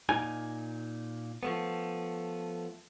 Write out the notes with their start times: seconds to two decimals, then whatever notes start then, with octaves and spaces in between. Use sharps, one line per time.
0.09 A#2 D#4 G#5
1.43 F3 A3 B3